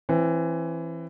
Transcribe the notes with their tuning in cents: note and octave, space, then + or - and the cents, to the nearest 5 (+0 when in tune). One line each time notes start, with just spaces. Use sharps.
E3 +15 C4 +30